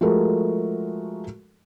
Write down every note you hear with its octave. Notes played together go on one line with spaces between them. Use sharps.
F3 G#3 A3 F#4 A4 A#4